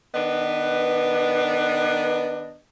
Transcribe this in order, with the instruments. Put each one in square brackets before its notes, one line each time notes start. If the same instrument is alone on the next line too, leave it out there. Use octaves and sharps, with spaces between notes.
[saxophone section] D#3 B3 D4 B4 D#5